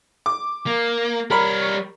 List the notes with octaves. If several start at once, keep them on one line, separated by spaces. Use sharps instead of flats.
D6
A#3
G3 A#4 C#5 A#5 B5